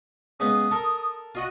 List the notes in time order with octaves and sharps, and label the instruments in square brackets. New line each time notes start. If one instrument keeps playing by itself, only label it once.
[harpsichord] C#3 G#3 B3 [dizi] D#6
[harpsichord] A4 A#4
[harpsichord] F4 D#5 F#5 [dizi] F#4